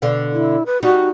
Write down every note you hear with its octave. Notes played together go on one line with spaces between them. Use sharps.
B2 D3 F5
E4
B4
G3 D#4 F#4